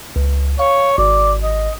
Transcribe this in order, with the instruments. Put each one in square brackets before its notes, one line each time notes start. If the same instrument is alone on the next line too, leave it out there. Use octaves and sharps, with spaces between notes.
[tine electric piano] C#2
[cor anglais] C#5 [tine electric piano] F5
[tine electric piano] G#1 [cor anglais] D5
[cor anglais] D#5